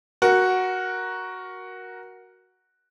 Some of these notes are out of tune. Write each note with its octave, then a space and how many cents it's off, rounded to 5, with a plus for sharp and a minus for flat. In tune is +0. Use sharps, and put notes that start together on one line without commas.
F#4 +0 A#4 +10